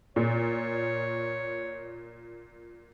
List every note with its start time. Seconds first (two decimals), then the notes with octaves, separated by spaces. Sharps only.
0.16 A#2 C#5